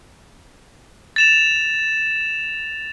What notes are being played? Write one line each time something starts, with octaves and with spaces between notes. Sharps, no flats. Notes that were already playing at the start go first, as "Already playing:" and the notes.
A6 E7 F7